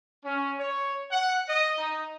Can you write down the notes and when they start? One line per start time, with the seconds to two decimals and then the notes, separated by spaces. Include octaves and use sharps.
0.24 C#4
0.60 C#5
1.12 F#5
1.49 D#5
1.78 D#4